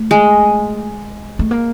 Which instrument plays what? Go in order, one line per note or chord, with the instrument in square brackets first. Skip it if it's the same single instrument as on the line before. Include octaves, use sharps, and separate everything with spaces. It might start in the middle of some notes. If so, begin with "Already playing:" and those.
Already playing: [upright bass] A3
[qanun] G#3
[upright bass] A3
A#3